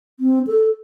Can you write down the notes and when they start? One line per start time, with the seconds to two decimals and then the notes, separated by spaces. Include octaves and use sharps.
0.20 C4
0.47 A4